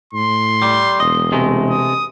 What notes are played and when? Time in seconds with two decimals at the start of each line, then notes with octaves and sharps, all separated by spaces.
0.13 A2 C6
0.62 G3
1.00 E1 D#5
1.32 C3 G#3 A3
1.70 D#6